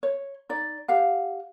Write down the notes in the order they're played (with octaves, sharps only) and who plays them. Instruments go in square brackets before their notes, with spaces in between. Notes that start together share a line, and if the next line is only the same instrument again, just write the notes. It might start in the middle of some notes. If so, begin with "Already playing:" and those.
[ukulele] C#5
D#4 D5
G4 F5 F#5